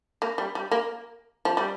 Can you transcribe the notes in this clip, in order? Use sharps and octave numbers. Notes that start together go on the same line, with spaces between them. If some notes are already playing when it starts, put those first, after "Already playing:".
A#3
G3
G3
A#3
F3
G3